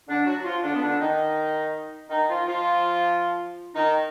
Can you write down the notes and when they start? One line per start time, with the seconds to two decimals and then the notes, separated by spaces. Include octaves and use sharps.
0.08 D3 D4
0.26 F#3 F#4
0.44 F3 F4
0.63 D3 D4
0.74 B3
0.81 D3 D4
1.00 D#3 D#4
2.10 D#3 D#4
2.28 F3 F4
2.46 F3 F4
3.75 D#3 D#4